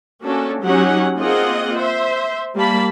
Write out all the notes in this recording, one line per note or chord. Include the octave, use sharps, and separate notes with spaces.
A#3 C#4 D4 F#4 A4
F#3 C#4 D#4 G4 F#5
A#3 C4 F4 G#4 D#5 F#5
C5 E5
G3 A#3 A5 B5